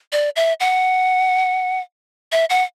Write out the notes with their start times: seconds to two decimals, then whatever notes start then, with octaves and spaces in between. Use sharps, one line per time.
0.12 D5
0.36 E5
0.60 F#5
2.32 E5
2.50 F#5